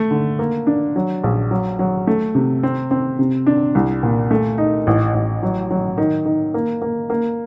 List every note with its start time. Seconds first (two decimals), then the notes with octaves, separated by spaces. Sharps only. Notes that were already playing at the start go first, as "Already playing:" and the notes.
Already playing: A3
0.11 D3
0.39 A#3
0.67 D4
0.96 F#3
1.24 A#1
1.51 F#3
1.79 F#3
2.07 A3
2.35 C3
2.63 C4
2.91 C4
3.19 C3
3.47 D4
3.75 C2
4.03 A#2
4.31 A3
4.58 D#4
4.87 A1
5.14 A1
5.43 F#3
5.71 F#3
5.98 D#3
6.26 D#3
6.54 A#3
6.82 A#3
7.10 A#3